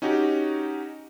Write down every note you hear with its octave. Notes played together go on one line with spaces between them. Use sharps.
C#4 D#4 F#4 G4